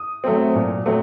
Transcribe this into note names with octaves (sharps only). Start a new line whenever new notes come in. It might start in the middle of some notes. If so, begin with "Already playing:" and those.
Already playing: D#6
F#3 A3 C4
A#2
F#3 A3 C4